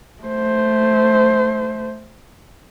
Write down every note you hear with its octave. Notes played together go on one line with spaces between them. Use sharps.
A3 C5